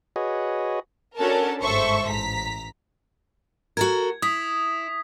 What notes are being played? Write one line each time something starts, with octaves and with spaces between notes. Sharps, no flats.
F#4 G#4 B4 C#5 D#5
C#4 D4 F#4 A4 A#4 A5
G1 G#2 A4 C5 E5 C#6
A1 A#5 B6
F#4 A4 A#4 G#6
E4 D#6 B6